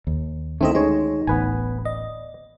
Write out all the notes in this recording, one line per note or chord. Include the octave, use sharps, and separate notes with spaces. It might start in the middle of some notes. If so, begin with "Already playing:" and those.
D#2
D2 D#3 A3 C4 C#4 E4 A4 D#5
G#3 D#4 C#5
D1 A1 B3 B4 G#5
D5 D#5